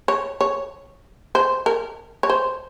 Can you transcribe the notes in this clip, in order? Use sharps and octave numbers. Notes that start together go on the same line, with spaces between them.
C#5
C#5
C5
A#4
C#5
C5